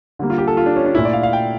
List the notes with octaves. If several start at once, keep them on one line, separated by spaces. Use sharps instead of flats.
D3 G3 A#3
F4
G4
A4
F4
D4
C#4
D4
A#2 A3 E4
D5
F5
F5
G5